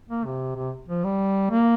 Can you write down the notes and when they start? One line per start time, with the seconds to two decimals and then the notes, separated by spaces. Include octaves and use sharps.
0.09 A#3
0.25 C3
0.56 C3
0.89 F3
1.04 G3
1.51 A#3